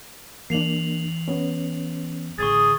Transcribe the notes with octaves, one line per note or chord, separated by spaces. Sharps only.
E3 A#3 D4 C7 F7 F#7
B3 C#4
A1 D3 G#4 C#6 D#6 A6